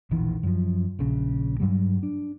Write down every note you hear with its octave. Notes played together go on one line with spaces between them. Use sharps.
E1 A#1 D#3 E3
F#2 F3
A#1 C#3
G2 F#3 G3
D4